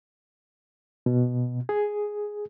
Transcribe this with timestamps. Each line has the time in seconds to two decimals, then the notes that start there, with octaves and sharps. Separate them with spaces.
1.06 B2
1.69 G#4